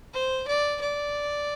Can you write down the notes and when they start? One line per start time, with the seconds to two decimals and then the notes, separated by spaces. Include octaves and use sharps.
0.13 C5
0.47 D5
0.81 D5